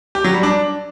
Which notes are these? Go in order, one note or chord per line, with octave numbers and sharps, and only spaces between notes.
G4
F#3
G3
D4